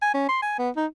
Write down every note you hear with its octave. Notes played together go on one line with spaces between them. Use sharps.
G#5
C#4
C6
G#5
B3
D#4